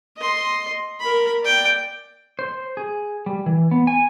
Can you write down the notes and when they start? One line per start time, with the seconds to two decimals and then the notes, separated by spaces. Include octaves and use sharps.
0.17 D#5 C6
1.00 A#4 B5
1.43 D5 G5
2.39 C5
2.77 G#4
3.26 G3
3.46 E3
3.71 B3
3.87 G#5